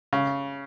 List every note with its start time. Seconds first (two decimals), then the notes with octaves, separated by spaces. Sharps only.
0.13 C#3